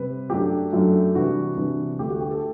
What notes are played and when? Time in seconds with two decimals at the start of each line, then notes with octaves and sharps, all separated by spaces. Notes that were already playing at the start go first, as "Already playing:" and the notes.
Already playing: C3 G3 C4 B4
0.30 F#2 F#3 A3 D4 G4
0.72 F#2 F#3 A3 D4
1.15 C3 E3 G3 D4 F#4
1.57 C3 E3 G3 D4
1.99 D2 D3 A3 E4 G4
2.09 F#4
2.21 G4
2.31 A4